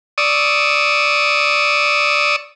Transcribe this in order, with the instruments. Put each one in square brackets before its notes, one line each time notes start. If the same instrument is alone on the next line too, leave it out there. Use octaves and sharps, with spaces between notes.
[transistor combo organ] D5 C#6 D#6 E6